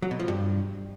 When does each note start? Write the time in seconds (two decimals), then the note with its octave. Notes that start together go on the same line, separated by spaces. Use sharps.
0.02 F#3
0.11 B2
0.19 F3
0.28 G2